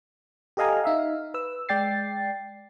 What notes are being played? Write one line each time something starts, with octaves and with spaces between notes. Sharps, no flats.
G4 A4 D#5 F5 G#5 A#5
D#4 E5 F5
B4 E6
G#3 D5 G5 A6 C7